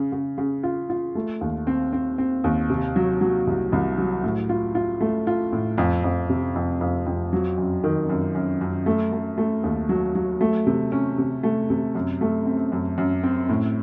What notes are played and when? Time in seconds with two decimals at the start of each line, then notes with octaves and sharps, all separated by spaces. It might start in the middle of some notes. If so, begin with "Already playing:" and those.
Already playing: C#3
0.12 C#3
0.38 C#3
0.63 F4
0.90 F4
1.15 A3
1.41 D#2
1.67 C4
1.93 C4
2.18 C4
2.44 D#2
2.70 C3
2.96 F#3
3.21 F#3
3.47 C2
3.72 C2
3.98 F#3
4.24 A2
4.49 F4
4.75 F4
5.01 A3
5.27 F4
5.53 A2
5.78 F2
6.04 F2
6.29 C3
6.56 F2
6.81 F2
7.06 F2
7.33 F#3
7.58 F#2
7.84 D#3
8.09 F#2
8.35 F#2
8.61 F#2
8.86 A3
9.12 A3
9.38 A3
9.64 D#2
9.89 F#3
10.15 F#3
10.41 A3
10.67 C3
10.92 C#4
11.18 C3
11.43 A3
11.70 C3
11.95 F#2
12.21 A3
12.46 C4
12.72 F#2
12.98 F#2
13.23 C4
13.49 A2